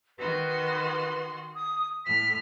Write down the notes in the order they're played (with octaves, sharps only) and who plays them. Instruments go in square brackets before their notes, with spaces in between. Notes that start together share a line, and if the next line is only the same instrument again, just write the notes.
[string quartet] D#3 F#4 C6 [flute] B4
[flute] D#6
[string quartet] A2 F6 [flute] B6